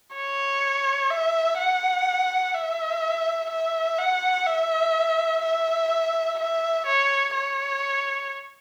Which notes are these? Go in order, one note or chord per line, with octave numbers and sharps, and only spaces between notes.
C#5
E5
F#5
E5
E5
F#5
E5
E5
E5
C#5
C#5